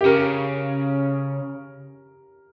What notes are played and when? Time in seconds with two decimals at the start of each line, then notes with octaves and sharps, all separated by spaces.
0.01 G4
0.05 C#3 A#4